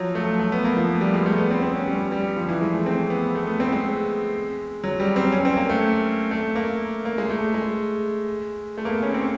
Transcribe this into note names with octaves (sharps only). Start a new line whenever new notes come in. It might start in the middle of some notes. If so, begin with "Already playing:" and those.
Already playing: F3 F#3
A3
A3
B3
A#3
F3
G3
G#3
A3
B3
C4
C4
C#4
G3
G3
F3
E3
G#3
A3
C4
B3
A3
B3
C4
G#3
F#3
G3
C4
C#4
C4
A#3
A3
A3
A#3
A#3
G#3
A3
G#3
A3
A#3
B3
C#4
C4